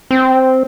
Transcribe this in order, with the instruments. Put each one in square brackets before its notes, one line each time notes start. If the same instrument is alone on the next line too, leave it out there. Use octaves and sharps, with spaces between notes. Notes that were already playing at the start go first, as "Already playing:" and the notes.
[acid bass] C4